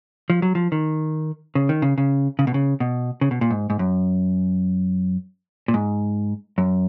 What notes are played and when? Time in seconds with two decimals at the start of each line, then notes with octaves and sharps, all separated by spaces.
0.30 F3
0.42 F#3
0.55 F3
0.72 D#3
1.55 C#3
1.69 D#3
1.82 C#3
1.98 C#3
2.39 C#3
2.47 B2
2.54 C#3
2.80 B2
3.21 C#3
3.31 B2
3.41 A#2
3.50 G#2
3.70 G#2
3.79 F#2
5.68 A#2
5.74 G#2
6.58 F#2